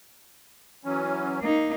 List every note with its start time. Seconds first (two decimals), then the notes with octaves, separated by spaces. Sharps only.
0.85 E3 F#3 C#4
1.41 A#3 D#4